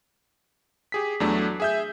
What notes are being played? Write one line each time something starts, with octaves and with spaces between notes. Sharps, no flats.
G4 G#4 B6
E2 F#3 A3 D4
G#4 E5 G6